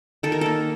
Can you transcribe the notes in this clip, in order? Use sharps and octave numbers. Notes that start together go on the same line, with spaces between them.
D#3 A4
A#4
A#3 A4